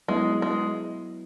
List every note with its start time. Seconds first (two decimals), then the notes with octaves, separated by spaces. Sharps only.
0.08 F#3 G#3 B3 E4
0.42 G#3